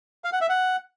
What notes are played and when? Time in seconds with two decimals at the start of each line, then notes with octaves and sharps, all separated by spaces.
0.24 F5
0.33 F#5
0.41 E5
0.49 F#5